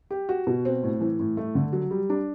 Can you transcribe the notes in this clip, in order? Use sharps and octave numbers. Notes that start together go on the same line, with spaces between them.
G4
F#4
B2
C4
A2
E3
A2
A3
D3
F#3
G3
D4